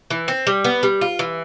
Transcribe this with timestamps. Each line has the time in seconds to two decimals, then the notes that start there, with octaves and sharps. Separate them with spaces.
0.11 E3
0.28 C4
0.47 G3
0.64 B3
0.83 G3
1.01 F4
1.19 E3